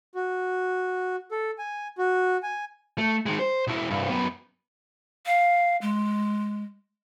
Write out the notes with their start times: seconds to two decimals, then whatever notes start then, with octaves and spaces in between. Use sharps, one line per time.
0.15 F#4
1.31 A4
1.58 G#5
1.98 F#4
2.43 G#5
2.98 A3
3.26 D#3 G#3
3.40 C5
3.67 B2 E4
3.90 C2 G2
4.10 F#2 B3
5.26 F5
5.82 G#3